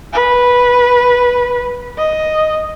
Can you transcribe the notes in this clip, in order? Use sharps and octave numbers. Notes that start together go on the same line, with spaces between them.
B4
D#5